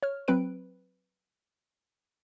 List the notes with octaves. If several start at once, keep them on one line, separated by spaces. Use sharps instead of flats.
C#5 F6
F#3 C4 B4 D7